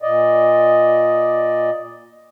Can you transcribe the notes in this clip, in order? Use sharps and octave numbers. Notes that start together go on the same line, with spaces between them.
A#2 D5 D#5